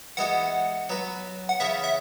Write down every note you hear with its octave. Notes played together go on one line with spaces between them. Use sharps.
E3 G#3 B3 F#4 F#5
F#3 B3 F#4 B4
F#5
C#3 E3 B3 G#4 B4 E5
E5